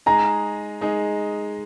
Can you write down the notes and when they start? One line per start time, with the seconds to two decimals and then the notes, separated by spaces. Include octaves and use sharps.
0.06 G#3 D#4 G#4 A#5
0.81 G#3 D#4 G#4